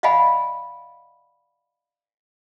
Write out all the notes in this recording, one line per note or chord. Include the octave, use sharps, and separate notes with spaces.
D5 D#5 F5 F#5 G#5 B5